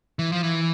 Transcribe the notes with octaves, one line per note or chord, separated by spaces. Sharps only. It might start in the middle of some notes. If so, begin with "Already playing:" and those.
E3
F3
E3